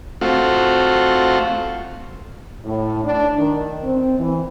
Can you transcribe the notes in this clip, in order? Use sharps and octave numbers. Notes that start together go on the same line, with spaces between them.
A3 C4 F4 F#4
A2
D4
D#3
C4
E3